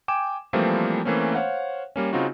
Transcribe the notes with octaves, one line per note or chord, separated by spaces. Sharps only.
G5 G#5 D6 E7
E3 F3 G3 A3 A#3 C4
E3 A3 A#3 C4 C#4
C5 C#5 F5 F#5
G3 A#3 C#4
C#3 C4 D#4 F4 F#4